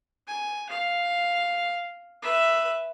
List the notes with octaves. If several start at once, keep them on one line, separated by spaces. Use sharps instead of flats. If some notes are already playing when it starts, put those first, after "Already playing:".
G#5
F5
B4 E5